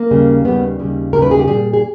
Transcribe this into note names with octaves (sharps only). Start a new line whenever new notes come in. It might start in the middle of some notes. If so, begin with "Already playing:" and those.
Already playing: A#3
D#2 C#3 G3
D#2 C#3 G3 B3
D#2 C#3 G3
D#2 C#3 G3 A#4
B4
G#4
G4
A#2 G3 G#4
G#4